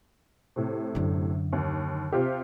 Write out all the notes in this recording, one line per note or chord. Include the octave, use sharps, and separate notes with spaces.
A2 C3
F#2 D3
D#2
C3 F4 G4